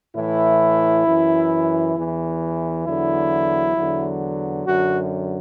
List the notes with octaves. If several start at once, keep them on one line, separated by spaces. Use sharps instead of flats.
A2 E3 E4
F#2 E3
E2 E3
E2 D3 F#3 E4
E2 D3 F#3
F#2 D3 F#3 F#4